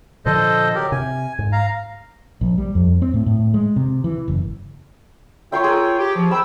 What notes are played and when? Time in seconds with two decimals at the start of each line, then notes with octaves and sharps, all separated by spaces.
0.26 A#2 D3 F3 A4 C5 D#5
0.75 F#3 G4 A#4
0.92 C3 G#5
1.39 G#2
1.52 F5 A#5
2.41 A#1
2.58 G3
2.75 F2
3.02 C4
3.14 A2
3.26 A2
3.54 G#3
3.76 C3
4.04 E3
4.28 F#1
5.52 F4 C#5 E5 G5 C6 C#6
5.64 G#4 A#4
5.99 G4
6.16 F3
6.31 G5 B5 E6